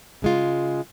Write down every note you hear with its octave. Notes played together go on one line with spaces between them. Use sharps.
C#3 G#3 F4